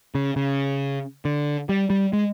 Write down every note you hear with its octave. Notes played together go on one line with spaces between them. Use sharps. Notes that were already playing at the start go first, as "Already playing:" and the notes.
C#3
C#3
D3
G3
G3
G#3